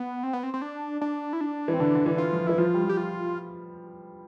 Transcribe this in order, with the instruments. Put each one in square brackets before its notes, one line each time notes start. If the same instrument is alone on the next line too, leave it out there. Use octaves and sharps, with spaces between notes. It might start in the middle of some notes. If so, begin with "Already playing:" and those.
Already playing: [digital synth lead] B3
C4
B3
C4
C4
D4
D4
E4
D4
[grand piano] E3
[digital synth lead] C4
[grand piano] D3 [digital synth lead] D4
[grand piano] D3
E3
[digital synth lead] F4
[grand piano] F3
[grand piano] E3 [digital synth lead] E4
[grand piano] F3 [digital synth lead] F4
[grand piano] G3
F3
[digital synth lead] G4
F4